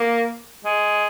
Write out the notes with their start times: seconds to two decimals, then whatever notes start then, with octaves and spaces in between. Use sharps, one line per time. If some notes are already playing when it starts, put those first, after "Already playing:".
Already playing: A#3
0.65 G#3